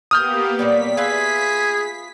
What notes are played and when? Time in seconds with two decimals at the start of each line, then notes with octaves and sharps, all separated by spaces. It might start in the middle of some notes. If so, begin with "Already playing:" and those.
0.11 A#3 B3 G4 D#6 F6 G6
0.59 A#2 F#3 G3 B6
0.97 F4 G#4 B4 E5